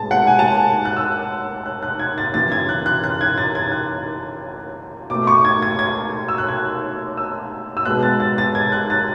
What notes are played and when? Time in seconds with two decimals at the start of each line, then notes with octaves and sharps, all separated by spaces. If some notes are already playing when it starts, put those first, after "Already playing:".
Already playing: A2 G#3 B3 A5
0.11 F#5
0.27 G#5
0.39 A5
0.51 G#5
0.85 F#6
0.97 E6
1.66 F#6
1.83 F#6
1.99 G#6
2.18 A6
2.34 F#2 C#3 E3 A6
2.52 G#6
2.69 F#6
2.86 F#6
3.04 F#6
3.21 G#6
3.38 A6
3.55 G#6
3.72 F#6
5.10 B2 A3 D6
5.27 C#6
5.45 G#6
5.62 G#6
5.79 G#6
6.28 E6
6.38 F#6
6.48 G#6
7.17 E6
7.77 E6
7.85 B2 G#3 B3 F#6
8.03 A6
8.20 A6
8.38 A6
8.55 G#6
8.72 F#6
8.90 A6